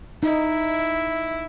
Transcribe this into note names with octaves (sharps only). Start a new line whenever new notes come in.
D#4 E4